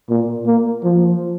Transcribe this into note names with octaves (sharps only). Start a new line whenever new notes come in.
A#2
A#3
F3